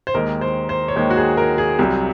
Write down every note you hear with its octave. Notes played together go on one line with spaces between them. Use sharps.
C5
D#2 D#3 G#3 A#4
C5
C5
C#5
D#2 D#3 G#3 C5
F#4
G#4
A#4
G#4
C2 C3 F#3